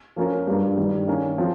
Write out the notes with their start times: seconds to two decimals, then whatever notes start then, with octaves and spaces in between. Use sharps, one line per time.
0.16 F3 A#3 C#4 F4 A#4
0.47 G2 G3 A#3
0.77 G2 D#3 G3
1.07 D#3 A#3 C#4
1.38 F3 C4 F4